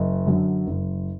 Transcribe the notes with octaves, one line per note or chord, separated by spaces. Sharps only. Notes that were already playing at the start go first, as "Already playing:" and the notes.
Already playing: F#1 D#5
F#2 D3 F#3
F#1